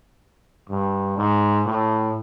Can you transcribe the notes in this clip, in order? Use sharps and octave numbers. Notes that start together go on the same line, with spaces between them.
G2
G#2
A2